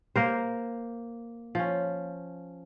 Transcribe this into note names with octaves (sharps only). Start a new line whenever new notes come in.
A#3 A#4 C5
F3 C#4